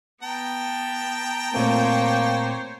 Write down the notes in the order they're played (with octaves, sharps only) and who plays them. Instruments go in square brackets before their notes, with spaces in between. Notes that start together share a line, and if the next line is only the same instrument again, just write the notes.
[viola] B3 [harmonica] G5 A5 A#5
[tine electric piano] A#2 A3 C4 [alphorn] A#3 [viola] C5 C#5